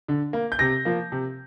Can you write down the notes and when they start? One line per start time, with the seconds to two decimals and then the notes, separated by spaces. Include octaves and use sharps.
0.08 D3
0.33 A#3
0.52 G6
0.59 C3 A#6
0.85 F3 A#3
1.12 C3